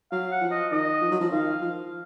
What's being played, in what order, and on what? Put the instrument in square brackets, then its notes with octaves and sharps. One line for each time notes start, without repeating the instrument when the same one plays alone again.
[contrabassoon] F#3 [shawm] F5
[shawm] F#5
[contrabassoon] F3
[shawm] D#5
[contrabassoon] D#3 [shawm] D#5
[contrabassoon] F3
F#3
F3
[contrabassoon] D#3 [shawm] F5
[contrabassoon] F3